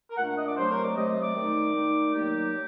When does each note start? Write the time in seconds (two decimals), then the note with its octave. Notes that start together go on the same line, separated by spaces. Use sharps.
0.08 A#4
0.17 A#2 A3 D4 F#5
0.28 F#5
0.38 D#5
0.48 D5
0.57 C3 F#3 A3 C5
0.70 A#4
0.84 D5
0.96 C3 F#3 A3 D#5
1.09 D#5
1.22 D5
1.35 D#3 A3 D#4
1.74 D#3 A3 D#4
2.14 D#3 F#3 A#3 D#4 G4
2.53 F#3